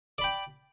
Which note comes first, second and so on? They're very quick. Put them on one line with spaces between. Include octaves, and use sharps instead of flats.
D5 B5 G5